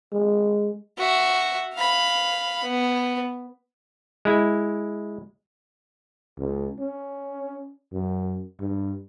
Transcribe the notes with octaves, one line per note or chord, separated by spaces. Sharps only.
G#3
F#4 E5
F5 B5
B3
G#3 E4
C#2
C#4
F#2
G2